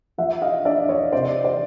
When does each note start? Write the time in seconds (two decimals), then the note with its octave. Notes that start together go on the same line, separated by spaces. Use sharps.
0.18 F3 E5 F#5
0.42 D#5 F5
0.65 D4 D5 E5
0.89 C#5 D#5
1.12 C3 C5 D5
1.44 C5 D5